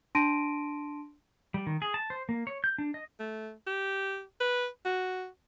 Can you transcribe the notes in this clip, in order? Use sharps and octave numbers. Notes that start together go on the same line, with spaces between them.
D4 A5 C6 A#6 D7 D#7
G3
D#3
G#4
A5
C5
A#3
C#5
G6
D4
D#5
A3
G4
B4
F#4